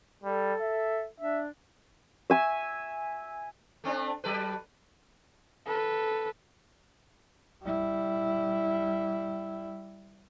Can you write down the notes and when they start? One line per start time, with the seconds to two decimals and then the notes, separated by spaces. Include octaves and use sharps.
0.24 G3 A4
0.61 E5
1.20 D4 E5
2.30 E5 G#5 E6
3.84 A3 C4 D4
4.24 F#3 A4 B4
5.66 A4 B4
7.63 G3 E4